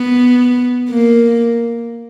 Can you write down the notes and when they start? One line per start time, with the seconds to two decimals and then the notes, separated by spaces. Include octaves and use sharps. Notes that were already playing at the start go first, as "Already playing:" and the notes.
Already playing: B3
0.90 A#3